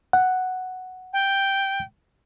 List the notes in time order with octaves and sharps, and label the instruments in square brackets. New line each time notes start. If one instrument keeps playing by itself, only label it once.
[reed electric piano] F#5
[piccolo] G5